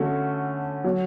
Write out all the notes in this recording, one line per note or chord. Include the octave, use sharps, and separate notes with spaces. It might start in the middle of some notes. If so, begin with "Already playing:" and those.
Already playing: D3 A3 C#4 F#4
F#3